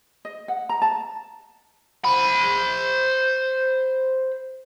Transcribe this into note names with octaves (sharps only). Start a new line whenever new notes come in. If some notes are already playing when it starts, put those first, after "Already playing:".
D#5
F#5
A#5
A5
C5 B5